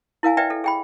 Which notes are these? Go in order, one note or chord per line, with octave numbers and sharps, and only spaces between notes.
E4 A#4 F5 G#5
B4 D5 E5 G5
A4
G#4 G5 B5